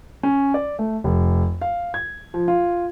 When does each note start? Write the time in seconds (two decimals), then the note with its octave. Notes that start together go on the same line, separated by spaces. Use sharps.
0.23 C#4
0.54 D5
0.79 A3
1.04 F1
1.62 F5
1.94 G#6
2.34 F3
2.48 F4